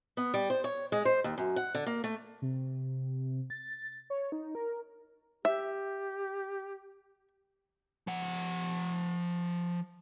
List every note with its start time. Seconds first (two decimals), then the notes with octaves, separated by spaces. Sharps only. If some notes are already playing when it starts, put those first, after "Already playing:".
0.17 B3
0.34 G3
0.50 C5
0.64 C#5
0.92 G#3
1.05 C5
1.24 D#2
1.38 F#2
1.56 F#5
1.75 D3
1.86 A#3
2.04 A3
2.42 C3
3.50 A6
4.10 C#5
4.32 D#4
4.55 A#4
5.45 G4 E5
8.07 F3 F#5